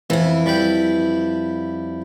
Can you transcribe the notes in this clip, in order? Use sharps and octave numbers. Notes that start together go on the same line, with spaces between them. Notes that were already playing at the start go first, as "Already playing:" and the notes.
F2 E3 E4
G3 B4 G5